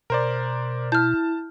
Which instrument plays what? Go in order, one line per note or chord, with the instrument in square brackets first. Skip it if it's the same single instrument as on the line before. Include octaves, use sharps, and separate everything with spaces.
[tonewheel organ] B2 [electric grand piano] A#4 C5 D5
[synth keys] E4 [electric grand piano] A5 [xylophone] F6 G6